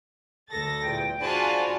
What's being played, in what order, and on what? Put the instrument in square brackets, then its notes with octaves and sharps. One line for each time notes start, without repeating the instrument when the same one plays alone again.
[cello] D2 A4 [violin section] A6 A#6
[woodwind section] E2 A#2 [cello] G5
[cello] D4 F#4 [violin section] F4 G#5 A5 [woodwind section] G#4 C5 B5